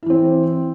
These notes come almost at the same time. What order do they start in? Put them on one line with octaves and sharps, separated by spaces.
E4 E3 C4